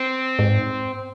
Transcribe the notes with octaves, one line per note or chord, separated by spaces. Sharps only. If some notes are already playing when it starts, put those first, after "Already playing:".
Already playing: C4
G#2